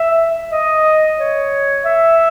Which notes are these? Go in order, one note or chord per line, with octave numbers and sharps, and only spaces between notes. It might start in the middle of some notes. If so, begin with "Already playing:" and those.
Already playing: E5
D#5
C#5
E5